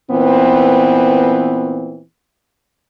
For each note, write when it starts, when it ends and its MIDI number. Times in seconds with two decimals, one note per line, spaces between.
0.11 2.01 46
0.11 2.01 52
0.11 2.01 59
0.11 2.01 60